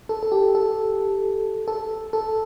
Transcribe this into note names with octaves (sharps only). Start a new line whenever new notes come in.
A4
A4
G4
A4
A4
A4